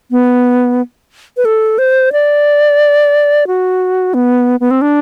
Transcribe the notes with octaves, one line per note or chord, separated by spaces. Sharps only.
B3
B4
A4
C5
D5
F#4
B3
B3
C4
D4